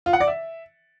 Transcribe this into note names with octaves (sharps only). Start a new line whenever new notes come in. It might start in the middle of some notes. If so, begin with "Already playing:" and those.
F4
F#5
D5
E5